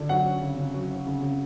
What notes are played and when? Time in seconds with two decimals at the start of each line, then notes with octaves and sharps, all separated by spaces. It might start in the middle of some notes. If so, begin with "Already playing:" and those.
Already playing: D3
0.09 F#3 F#5
0.26 C#4
0.42 C#3
0.57 C#3
0.74 F#3
0.91 C#4
1.07 C#3
1.22 C#3